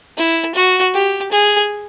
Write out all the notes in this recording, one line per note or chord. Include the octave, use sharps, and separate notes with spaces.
E4
F#4
G4
G#4